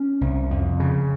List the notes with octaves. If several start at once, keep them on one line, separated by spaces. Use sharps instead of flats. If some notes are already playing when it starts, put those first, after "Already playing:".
Already playing: C#4
C2
F2
C#3